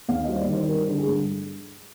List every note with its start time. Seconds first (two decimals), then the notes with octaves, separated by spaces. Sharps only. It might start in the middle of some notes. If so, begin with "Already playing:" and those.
0.08 D#2 F5
0.23 D#5
0.28 G3 C5
0.38 D5
0.48 D#3
0.54 C5
0.68 G3 A#4
0.88 D3
0.98 G#4
1.08 G2